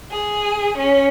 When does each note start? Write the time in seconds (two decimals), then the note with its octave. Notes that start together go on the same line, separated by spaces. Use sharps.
0.11 G#4
0.77 C#4